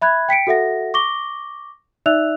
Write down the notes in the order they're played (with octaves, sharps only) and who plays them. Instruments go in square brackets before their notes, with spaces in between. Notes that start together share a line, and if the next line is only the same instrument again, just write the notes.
[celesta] E5 B5 F#6 G#6
G5 B6 C#7 D7
F#4 A4 E5 F#5 A#6
C#6 D6 A#6 G7
D#4 D5 E5 E6 F#6 F7